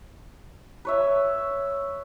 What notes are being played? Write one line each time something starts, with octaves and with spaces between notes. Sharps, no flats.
B4 C#5 E5